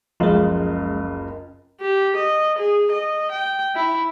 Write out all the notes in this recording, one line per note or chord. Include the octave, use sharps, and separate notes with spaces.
F#1 C#2 F3 G#3 F4
G4
D#5
G#4
D#5
G5
E4